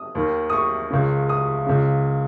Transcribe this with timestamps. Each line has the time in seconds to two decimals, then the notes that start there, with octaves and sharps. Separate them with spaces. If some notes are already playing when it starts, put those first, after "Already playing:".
Already playing: D#6
0.15 D#2 D#3
0.50 D#6
0.53 C#6
0.90 C#2 C#3
1.29 D#6
1.66 C#2 C#3